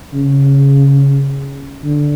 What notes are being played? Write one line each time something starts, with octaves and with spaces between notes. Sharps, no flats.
C#3
D3